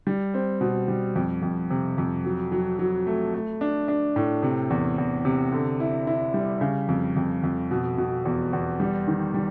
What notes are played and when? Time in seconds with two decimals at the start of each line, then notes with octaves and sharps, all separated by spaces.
0.07 G3
0.34 C4
0.61 B2
0.88 G3
1.15 F2
1.42 F2
1.71 C3
1.98 F2
2.24 F#3
2.52 F#3
2.79 F#3
3.07 A3
3.34 A3
3.61 D4
3.88 D4
4.16 A2
4.43 C3
4.70 E2
4.98 E2
5.25 C3
5.52 D3
5.80 E4
6.07 E4
6.34 G3
6.61 C#3
6.88 F2
7.16 F2
7.43 F2
7.71 B2
7.98 B2
8.25 E2
8.53 E2
8.80 G3
9.07 D#3
9.34 G3